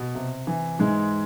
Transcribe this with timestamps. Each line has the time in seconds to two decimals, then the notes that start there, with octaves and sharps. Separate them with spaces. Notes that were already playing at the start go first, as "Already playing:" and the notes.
Already playing: B2
0.15 C3
0.47 E3
0.79 G#2 E3 G#3